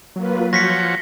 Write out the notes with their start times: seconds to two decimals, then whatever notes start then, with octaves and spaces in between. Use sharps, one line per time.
0.16 F#3 A#3 F4 B4
0.53 F3 F#4 C#5 G6 A#6 B6 C#7